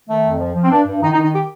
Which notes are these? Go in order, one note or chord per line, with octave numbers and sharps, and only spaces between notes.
D#3 A3
F2
F3
F3
C4
G2 D4
G2
D#3 D#4
D#4
D#3
D#4
G4